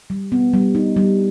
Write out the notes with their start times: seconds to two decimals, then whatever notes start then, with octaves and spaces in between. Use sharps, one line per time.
0.10 G3
0.32 B3
0.53 G3
0.75 D#4
0.96 G3